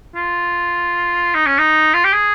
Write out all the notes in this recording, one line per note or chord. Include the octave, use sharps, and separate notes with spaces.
F4
D#4
C#4
D#4
F4
G4
G#4